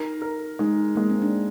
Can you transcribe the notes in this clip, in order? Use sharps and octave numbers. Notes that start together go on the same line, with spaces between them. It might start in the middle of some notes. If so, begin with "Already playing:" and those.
Already playing: D#4 A#4
A#4
G#3 D#4
G#3 A#3
C4
D4